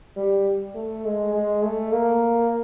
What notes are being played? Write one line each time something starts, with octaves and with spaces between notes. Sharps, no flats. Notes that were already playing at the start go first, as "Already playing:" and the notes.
G3
A3
G#3
G#3
A3
A#3